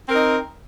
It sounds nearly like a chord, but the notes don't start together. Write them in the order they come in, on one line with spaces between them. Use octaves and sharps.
C4 A#4 D#4